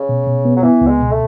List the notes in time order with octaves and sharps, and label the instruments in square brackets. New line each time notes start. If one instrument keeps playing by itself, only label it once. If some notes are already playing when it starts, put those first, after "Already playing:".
Already playing: [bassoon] C#3
[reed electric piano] B2
B2
B3
[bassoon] F#3
[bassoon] E3 [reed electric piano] B3
[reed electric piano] C#2
[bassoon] G#3
[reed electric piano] B2
[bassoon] A3